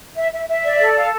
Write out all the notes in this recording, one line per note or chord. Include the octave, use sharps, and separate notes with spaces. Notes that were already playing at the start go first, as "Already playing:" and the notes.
E5
E5
E5
D5
A4
F5